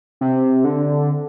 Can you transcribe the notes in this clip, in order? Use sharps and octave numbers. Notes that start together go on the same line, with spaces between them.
C3
D3